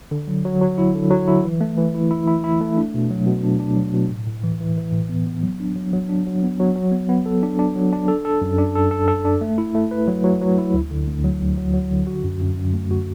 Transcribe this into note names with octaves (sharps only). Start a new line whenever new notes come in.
D3
F#3
F#3
F#3
E4
D3
F#3
E4
E3
A3
E3
E4
E4
E4
E4
A3
D4
B2
F#3
B2
D4
D4
F#3
B2
A2
A2
E3
E3
E3
A2
B3
B3
F#3
D4
F#3
F#3
D4
F#3
B3
F#3
F#3
B3
B3
A4
D4
D4
F#3
D4
A4
A4
F#2
D4
A4
A4
A4
D4
A3
E4
A3
B4
F#3
F#3
F#3
E4
D2
D3
D2
F#3
D2
F#3
F#3
D3
F#4
F#2
F#2
F#2
A3
F#4